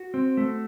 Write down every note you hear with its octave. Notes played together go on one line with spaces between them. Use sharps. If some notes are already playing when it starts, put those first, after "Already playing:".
Already playing: F#4
C4
A3